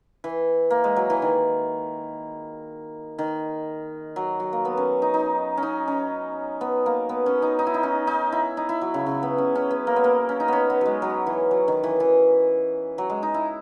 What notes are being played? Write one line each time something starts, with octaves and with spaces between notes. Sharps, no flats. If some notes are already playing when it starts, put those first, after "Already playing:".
E3
A#3
G#3
F#3
E3
D#3
D#3
F#3
F#3
A#3
B3
C#4
D#4
D#4
C#4
D#4
C#4
B3
A#3
B3
C#4
D#4
D#4
E4
D#4
C#4
D#4
E4
D#4
E4
F#3
C#3
C#3
B3
C#4
C#4
B3
A#3
B3
A#3
C#4
D#4
B3 C#4
B3
F#3 G#3
F#3
E3
F#3
D#3
E3
E3
F#3
G#3
D#4
E4